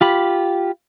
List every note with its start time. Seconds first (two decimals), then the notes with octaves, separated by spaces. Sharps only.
0.01 F4 G4 B5